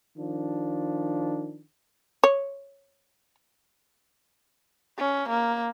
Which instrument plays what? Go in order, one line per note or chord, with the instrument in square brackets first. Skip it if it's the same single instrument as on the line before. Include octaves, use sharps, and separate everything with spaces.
[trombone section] D#3 F3 D4
[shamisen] C#5
[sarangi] C#4
A#3